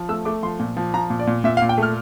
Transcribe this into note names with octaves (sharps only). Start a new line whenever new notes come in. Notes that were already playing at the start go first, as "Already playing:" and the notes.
Already playing: F3
A3 E6
A3 D6
F3 C6
A#2
F3
F3 A#5
A#2
D5
A#2
A#2 E5
F5
A#2
G5
A3 F6